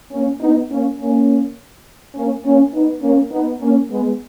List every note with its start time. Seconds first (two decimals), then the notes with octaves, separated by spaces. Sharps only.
0.11 A#3 C#4
0.40 B3 D#4
0.69 A#3 C#4
0.99 A#3 C#4
2.15 A#3 C#4
2.44 A#3 C#4
2.73 B3 D#4
3.02 A#3 C#4
3.31 B3 D#4
3.60 A#3 C#4
3.90 G#3 B3